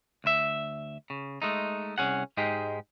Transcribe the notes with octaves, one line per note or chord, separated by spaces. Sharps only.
D2 E5
C#3
G#3 A3 D#4
C2 C#4 G#4 F#5
G#2 G#3 D#4 G4 G#4